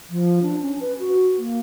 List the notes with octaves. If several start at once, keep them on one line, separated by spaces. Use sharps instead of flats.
F3
D4
C#4
B4
F#4
A#3